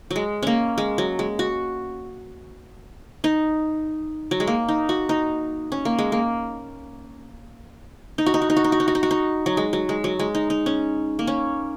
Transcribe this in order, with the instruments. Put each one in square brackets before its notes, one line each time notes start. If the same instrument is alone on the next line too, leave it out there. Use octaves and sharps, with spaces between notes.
[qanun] F#3
G#3
A#3 C#4
G#3
F#3
G#3
F#4
D#4
F#3
G#3
A#3
D#4
F#4
D#4
C#4
A#3
G#3
A#3
D#4
F#4
D#4
F#4
D#4
F#4
D#4
F#4
D#4
F#4
D#4
F#4
D#4
F#3
G#3
F#3
G#3
F#3
G#3
D#4
D#4
C#4
A#3
C#4